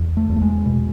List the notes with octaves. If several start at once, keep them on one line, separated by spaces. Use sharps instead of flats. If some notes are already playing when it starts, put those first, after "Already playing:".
Already playing: E2
A3
E2
A3
G#3
B2